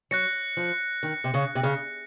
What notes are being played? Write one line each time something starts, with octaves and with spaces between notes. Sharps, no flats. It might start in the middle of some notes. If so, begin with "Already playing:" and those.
F#3 F#6 A#6 C#7
F3
D#3
C3
C#3
C3
C#3